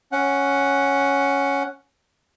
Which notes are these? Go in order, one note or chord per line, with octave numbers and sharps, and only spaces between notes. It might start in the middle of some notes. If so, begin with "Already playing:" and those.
C#4 F#5